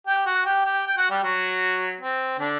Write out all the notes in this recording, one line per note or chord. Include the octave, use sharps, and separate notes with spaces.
G4 G5
F#4 F#5
G4 G5
G4 G5
G5
F#4 F#5
G3 G4
F#3 F#4
C4
D3 D4